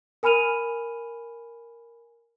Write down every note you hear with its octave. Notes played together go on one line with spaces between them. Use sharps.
A#4 G#5 B5 F6 D#7 F7